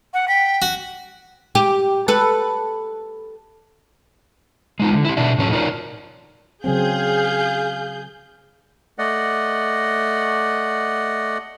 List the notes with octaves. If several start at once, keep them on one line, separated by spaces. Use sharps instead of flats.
F#5
G5 B6
F#4
G4
A4 B4
G#3 D#4 F4
D3
E4 G4
B2 D4 E5
A2 F3 F#3 C#4 A4
D#4 F4 F#4 A#4 C#5 D5
C#3 F#3 C4 G#4 F5 G6
A3 D5 D#5 F#5